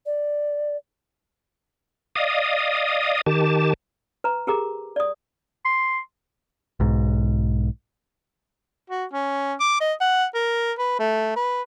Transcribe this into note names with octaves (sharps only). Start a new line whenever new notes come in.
D5
D5 D#5 F5 D#6
D#3 G4 A5
B4 A#5
G4 G#4 A#4 A#5 D6
D5 D#6
C6
B1 G#2
F#4
C#4
D6
D#5
F#5
A#4
B4
A3
B4